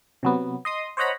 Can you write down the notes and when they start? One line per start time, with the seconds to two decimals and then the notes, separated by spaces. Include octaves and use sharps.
0.23 C3 F#3 B3
0.65 D#5 C6 D#6
0.97 C5 C#5 D#5 F#5 A#5 B5